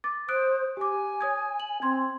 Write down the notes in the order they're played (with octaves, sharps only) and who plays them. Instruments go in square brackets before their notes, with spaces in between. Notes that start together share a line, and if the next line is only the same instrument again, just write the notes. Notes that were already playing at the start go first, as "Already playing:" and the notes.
[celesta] D6 A6
[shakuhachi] C5 [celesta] D#6 F#6 D7
[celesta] G4 D6 [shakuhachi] G#5
[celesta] C#5 D#6 G#6
F#7
[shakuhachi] C4 [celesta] C6 G#6